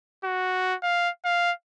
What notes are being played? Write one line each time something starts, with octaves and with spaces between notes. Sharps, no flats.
F#4
F5
F5